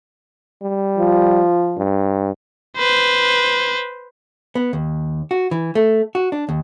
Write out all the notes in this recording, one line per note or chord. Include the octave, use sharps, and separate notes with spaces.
G3
F3
G2
B4 C5
B3
D#2
F#4
E3
A3
F#4
D4
D#2